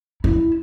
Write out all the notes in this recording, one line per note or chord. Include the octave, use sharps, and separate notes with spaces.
E4